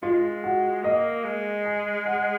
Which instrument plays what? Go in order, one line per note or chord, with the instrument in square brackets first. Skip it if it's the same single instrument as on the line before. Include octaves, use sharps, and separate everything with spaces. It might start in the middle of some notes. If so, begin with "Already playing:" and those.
[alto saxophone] G#3 [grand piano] F4
[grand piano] F#4
[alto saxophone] A#3 [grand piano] D#5
[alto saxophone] G#3
[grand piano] G#5
F#5